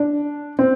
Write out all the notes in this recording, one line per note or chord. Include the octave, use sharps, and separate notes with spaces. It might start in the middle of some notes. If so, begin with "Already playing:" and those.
Already playing: D4
C4